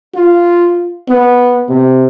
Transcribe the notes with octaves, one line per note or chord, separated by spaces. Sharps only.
F4
B3
C3